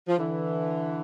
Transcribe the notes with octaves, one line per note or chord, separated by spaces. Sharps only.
F3
D3 E3